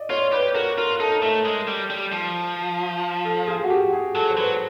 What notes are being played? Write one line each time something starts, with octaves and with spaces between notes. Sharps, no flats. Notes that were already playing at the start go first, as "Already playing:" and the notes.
Already playing: D5 D#5
F4 C#5
G4 B4
F#4 A#4
F4 A#4
D#4 A4
A#4
A3 A4
G#3
G3
G3
F3
A4
G#4
F#4
G4
G#4
F#3 A4
C5
F#3 B4